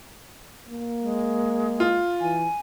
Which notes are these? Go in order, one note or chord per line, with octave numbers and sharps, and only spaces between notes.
A#3
G#3
F4
E3 G#5